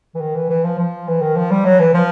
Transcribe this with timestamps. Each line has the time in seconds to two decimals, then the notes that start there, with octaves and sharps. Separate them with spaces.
0.15 E3
0.21 D#3
0.35 E3
0.49 E3
0.64 F3
0.79 F3
1.08 E3
1.22 D#3
1.36 F3
1.51 G3
1.65 F#3
1.79 E3
1.94 F3